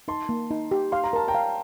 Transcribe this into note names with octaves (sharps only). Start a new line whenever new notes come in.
D#4 A5 C6
A#3
D#4
G4
F5 C6
A#5
A#4 A5
G5 A#5
F5